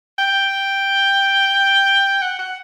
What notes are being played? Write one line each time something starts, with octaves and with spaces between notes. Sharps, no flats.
G5
F#5
F#5